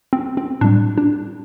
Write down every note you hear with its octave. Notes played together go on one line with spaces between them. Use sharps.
C4
C4
A2 G3 D4
D4